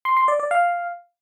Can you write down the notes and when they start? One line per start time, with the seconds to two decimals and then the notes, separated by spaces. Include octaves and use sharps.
0.05 C6
0.17 C6
0.28 D5
0.40 D5
0.51 F5